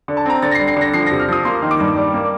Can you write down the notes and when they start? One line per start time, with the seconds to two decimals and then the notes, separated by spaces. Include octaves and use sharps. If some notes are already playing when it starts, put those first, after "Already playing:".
0.08 D3
0.17 A5
0.26 C4 A#5
0.42 D3 A6
0.51 A#6
0.55 C7
0.60 G3
0.68 C7
0.77 D3 A#6
0.94 F3 C7
1.06 C3 A#6
1.20 F6
1.28 F3 D#6
1.45 A#3 C6
1.62 D#3
1.71 D6
1.80 G2
1.96 G3
2.13 A#3